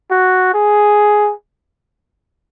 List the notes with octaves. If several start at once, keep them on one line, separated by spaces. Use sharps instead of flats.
F#4
G#4